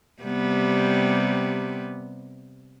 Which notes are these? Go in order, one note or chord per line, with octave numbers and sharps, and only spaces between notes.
C3 G3 B3